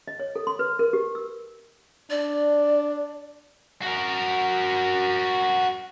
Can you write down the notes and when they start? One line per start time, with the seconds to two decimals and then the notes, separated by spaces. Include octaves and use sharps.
0.08 D#5
0.20 C#5
0.36 A4
0.47 C6
0.59 B4
0.79 A#4
0.93 G4
1.15 E6
2.10 D4 D5
3.83 F#4 A#4